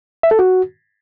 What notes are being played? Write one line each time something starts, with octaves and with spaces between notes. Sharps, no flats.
E5
A4
F#4